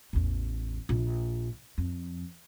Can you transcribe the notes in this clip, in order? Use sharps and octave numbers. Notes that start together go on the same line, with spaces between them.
A1 E2
A#1
F2